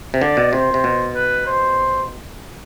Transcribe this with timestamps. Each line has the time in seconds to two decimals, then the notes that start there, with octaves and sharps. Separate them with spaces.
0.14 C3
0.22 D3 D5
0.37 B2
0.53 C3 C5
0.74 C3
0.84 B2
1.15 B4
1.47 C5